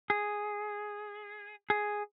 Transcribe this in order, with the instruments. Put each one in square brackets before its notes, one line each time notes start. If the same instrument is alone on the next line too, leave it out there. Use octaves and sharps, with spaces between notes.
[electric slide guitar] G#4
G#4